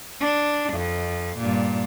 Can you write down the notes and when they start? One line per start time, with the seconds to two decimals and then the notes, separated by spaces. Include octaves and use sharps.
0.20 D4
0.73 F2
1.37 G2 A#2